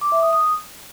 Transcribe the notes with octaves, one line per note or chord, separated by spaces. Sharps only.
D6
E5
D#6
D#6